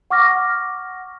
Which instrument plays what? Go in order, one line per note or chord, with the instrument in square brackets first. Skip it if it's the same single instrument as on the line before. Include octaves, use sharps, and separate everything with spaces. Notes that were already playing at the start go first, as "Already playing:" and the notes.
[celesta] F#5 C#6 D6 F6 A#6